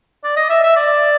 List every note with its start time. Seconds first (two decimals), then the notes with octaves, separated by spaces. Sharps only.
0.24 D5
0.36 D#5
0.49 E5
0.63 E5
0.76 D5